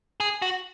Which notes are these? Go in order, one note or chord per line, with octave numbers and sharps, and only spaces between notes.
G#4
F#4